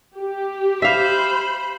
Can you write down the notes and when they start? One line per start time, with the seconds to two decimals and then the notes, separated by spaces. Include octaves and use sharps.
0.17 G4
0.82 C5 E5 F5 B5